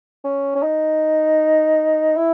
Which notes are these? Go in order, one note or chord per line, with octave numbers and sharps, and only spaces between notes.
C#4
C#4
D#4
E4